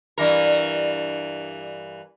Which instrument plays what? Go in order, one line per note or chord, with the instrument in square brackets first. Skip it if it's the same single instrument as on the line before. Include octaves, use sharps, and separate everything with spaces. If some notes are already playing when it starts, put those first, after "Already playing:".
[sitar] G2 E3 A#4